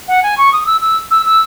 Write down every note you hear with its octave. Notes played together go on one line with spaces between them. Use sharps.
F#5
G#5
C#6
D#6
E6
E6
E6
E6